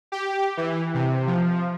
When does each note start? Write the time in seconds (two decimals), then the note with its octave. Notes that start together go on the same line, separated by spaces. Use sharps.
0.12 G4
0.57 E3
0.94 C3
1.27 F3